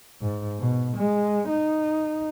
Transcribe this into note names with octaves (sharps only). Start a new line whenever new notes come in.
G#2
B2
G#3
D#4